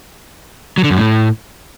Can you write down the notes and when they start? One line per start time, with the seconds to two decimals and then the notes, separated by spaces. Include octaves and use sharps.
0.78 F#3
0.84 D3
0.91 F#2
0.97 A2